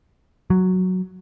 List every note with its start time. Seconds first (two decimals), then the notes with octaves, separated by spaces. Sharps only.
0.50 F#3